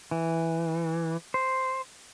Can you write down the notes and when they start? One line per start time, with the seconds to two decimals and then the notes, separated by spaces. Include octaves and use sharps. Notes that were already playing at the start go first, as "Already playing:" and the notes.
0.11 E3
1.34 C5